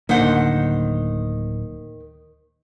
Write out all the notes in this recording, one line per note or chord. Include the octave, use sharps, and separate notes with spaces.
D1 D3 D#3 A#3 C5 F#5